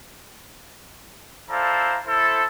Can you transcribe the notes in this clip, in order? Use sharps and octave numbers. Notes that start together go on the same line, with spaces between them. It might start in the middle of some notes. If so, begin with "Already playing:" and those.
E4 A4 C5 D5 F5 A#5
E4 A4 C5